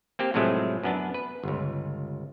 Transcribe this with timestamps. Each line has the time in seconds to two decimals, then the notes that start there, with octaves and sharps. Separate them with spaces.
0.19 A#3 C4 G4
0.34 A2 C3 F3 F#3 G#3 A3
0.83 F#2 B3 D4
1.14 B4
1.43 G1 C#2